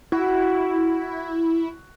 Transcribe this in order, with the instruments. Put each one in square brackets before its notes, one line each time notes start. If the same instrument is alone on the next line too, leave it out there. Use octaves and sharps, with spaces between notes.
[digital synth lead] E4 [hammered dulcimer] F#4